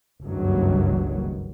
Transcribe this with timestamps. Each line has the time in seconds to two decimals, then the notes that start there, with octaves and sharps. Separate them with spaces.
0.25 F#1 C#2 G2 D#3 F#3